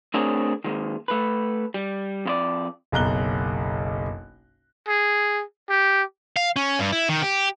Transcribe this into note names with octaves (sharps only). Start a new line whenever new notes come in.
A3 C4 D4 G#4 A#4 C#5
D#3 G#3 A#3
A3 B4
G3
F2 F4 D5
F#1 B1 A#5 F#6 G7
G#4
G4
F5
C#4
G2
E4
D#3
G4